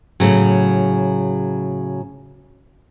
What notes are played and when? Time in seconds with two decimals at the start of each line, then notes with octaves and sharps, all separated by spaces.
0.20 A2 C#3 F#3